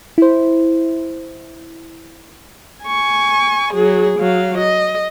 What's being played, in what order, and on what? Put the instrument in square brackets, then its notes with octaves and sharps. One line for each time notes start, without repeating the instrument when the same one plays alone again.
[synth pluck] E4 C5
[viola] G#5 C#6
F#3 G#4
F#3 F5
D#5